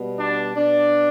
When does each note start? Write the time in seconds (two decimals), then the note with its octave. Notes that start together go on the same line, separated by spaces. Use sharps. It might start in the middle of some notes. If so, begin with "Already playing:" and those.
Already playing: B2 G3 B3
0.19 D4
0.56 B2 B3 D4